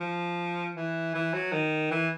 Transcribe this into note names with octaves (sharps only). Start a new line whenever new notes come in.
F3
E3
E3
F#3
D#3
E3